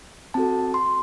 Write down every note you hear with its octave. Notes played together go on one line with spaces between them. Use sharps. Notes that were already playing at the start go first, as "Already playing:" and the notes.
C4 F#4 A4 A5
C6